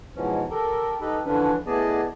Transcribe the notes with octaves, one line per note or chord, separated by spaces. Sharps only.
G#2 B2 E3 F3 C#4
G4 A4 A#4
D#4 G4 A4 B4
D3 E3 F3 C#4 D4 B4
A2 B3 G#4 D5 D#5 A5